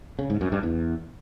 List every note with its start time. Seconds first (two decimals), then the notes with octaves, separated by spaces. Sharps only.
0.19 C#3
0.30 G#2
0.41 F#2
0.52 G2
0.63 E2